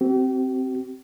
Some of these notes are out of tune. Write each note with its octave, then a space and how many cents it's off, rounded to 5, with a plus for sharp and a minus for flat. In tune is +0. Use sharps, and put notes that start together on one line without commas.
C4 +0 G4 -40